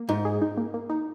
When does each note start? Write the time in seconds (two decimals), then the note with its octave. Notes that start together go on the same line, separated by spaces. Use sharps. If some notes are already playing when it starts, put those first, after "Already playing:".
Already playing: A#3
0.09 G#2 D#4
0.25 G#4
0.42 D#4
0.57 A#3
0.74 A#3
0.90 D#4